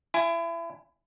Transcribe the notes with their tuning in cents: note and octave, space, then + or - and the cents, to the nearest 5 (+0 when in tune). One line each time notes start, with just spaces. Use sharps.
E4 +30 G#5 +0